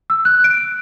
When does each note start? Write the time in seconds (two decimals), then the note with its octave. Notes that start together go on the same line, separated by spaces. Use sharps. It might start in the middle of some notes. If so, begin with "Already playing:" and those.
0.10 E6
0.25 F#6
0.44 D7